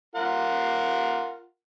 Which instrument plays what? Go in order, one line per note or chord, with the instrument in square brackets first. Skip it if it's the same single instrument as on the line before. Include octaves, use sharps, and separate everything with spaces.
[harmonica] F4 A#4 F#5